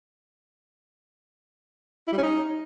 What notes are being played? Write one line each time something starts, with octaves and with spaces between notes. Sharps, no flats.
E4
G3
C#4
D#4